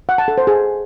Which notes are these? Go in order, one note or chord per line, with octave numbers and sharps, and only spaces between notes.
F#5
A5
A4
C5
G#4